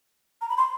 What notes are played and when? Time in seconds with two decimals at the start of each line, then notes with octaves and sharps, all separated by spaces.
0.41 A#5
0.49 B5
0.58 C6